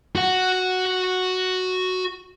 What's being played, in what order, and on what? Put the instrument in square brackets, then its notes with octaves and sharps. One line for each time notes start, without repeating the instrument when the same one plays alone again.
[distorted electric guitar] F#4 F#5